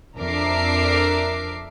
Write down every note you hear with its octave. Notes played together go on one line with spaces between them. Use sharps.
F2 D4 A#4 E5 D6 C7